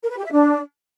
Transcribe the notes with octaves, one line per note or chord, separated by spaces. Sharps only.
A#4
B4
G4
E5
D4